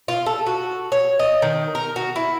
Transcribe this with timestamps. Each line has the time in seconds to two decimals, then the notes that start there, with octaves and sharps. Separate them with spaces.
0.08 F4
0.26 A4
0.46 F#4
0.92 C#5
1.19 D#5
1.42 D#3
1.75 A#4
1.96 F#4
2.16 E4